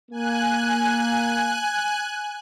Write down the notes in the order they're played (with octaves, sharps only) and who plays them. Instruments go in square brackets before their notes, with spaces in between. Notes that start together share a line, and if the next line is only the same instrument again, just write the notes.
[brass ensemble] A#3 [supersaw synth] G#5 F#6